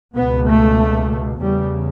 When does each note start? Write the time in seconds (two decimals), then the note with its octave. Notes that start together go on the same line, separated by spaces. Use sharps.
0.15 C#2 B2 B3
0.47 A3
1.41 E2 C#3 G3